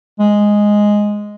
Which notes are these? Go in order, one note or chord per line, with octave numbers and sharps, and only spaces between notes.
G#3